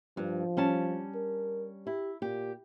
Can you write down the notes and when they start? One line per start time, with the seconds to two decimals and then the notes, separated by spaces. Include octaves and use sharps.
0.17 G2 F3
0.57 G3 C#4 A5
1.15 A#4
1.87 E4 G4
2.22 A#2 G4